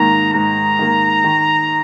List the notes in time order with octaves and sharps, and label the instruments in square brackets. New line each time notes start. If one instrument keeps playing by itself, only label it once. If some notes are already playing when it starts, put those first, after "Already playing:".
Already playing: [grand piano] G#2 D#3 A#3 [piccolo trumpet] A#5
[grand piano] G#2 [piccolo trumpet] A#5
[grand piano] D#3 A#3
D#3